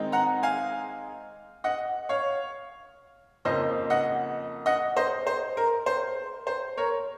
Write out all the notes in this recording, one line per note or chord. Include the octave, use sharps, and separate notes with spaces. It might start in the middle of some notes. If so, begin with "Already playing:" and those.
Already playing: D#3 G#3 C4 D#4
F#5 A#5
F5 G#5
D#5 F#5
C#5 F5
F2 C#3 F3 A#3 D#4 C5 D#5
D#5 F#5
D#5 F#5
C5 D#5
C5
A#4
C5
C5
A#4 C#5